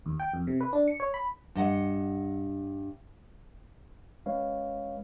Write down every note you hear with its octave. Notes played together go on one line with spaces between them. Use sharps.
D#2
G5
F2
C3
B4
D4
C#7
C#5
B5
G2 D#5 F#5
G#3 C#4 B4 C#5 F5